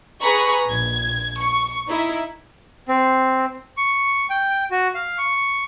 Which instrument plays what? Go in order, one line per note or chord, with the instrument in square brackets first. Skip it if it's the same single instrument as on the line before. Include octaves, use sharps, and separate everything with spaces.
[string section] G#4 B4 A#5 B5 C#6
A#1 G#6
C#6
D#4 E4 E5
[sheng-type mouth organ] C4
C#6
G5
F#4
F5
C#6